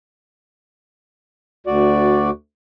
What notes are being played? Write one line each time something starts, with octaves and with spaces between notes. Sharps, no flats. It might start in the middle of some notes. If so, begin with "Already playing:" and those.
D2 F#4 D5